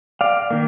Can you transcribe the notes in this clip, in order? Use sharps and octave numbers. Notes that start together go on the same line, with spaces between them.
D5 F5
D#3 A#3